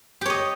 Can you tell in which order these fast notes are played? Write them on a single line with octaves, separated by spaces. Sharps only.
G4 C#5 D#5